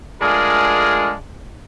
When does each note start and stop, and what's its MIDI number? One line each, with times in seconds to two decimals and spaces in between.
0.22 1.12 56
0.22 1.12 57
0.22 1.12 62
0.22 1.12 65
0.22 1.12 68
0.22 1.12 70